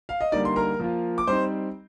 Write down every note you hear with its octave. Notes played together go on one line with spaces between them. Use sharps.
F5
D#5
D3 G3 A#3 D#4 D5
C6
A#4 A#5
F3 A#3 F4
D6
G3 C4 D#4 C5 C6